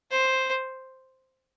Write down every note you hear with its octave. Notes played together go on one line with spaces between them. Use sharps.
C5